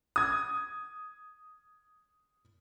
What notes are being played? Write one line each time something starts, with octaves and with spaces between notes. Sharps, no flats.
D#6 G#6